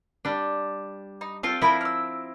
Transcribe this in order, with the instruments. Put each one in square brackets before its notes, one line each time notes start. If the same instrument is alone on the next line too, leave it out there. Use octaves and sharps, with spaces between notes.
[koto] G3 D4
[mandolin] D#4
[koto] C4 F4 F5 [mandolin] A4
[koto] F3 E4 A#4 [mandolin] A3 B5
[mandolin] E6 F6